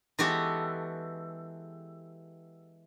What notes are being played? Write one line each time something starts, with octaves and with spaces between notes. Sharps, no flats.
E3 G#3 B3 F#4 G4 A4